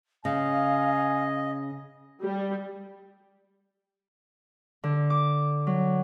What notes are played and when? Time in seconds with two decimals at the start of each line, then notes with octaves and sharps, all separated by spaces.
0.25 C#3 D#5 F5 G#5
2.22 G3
4.84 D3
5.10 D6
5.67 F#3